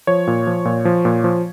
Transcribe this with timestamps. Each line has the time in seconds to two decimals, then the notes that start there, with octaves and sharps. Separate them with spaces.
0.07 F3 C#5
0.27 A#2
0.47 F3
0.65 A#2
0.85 F3
1.05 A#2
1.24 F3